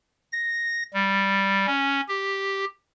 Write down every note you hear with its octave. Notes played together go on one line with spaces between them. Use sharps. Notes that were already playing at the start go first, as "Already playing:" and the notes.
A#6
G3
C#4
G4